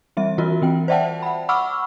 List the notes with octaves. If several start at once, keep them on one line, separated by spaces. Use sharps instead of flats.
E3 G3 C4 E5
E3 F4 F#4 A#4
E3 C4 G5
C5 D5 E5 F#5 G5 A5
F#5 B5
F#5 B5 C#6 D6 E6 F6